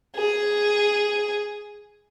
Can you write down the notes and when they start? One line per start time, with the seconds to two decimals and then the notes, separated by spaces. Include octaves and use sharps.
0.15 G#4